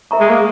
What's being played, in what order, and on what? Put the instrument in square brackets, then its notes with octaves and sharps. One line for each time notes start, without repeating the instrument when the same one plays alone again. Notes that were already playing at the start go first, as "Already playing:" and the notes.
[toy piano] A#4 E5 A#5 C#6
[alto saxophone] G#3
A#3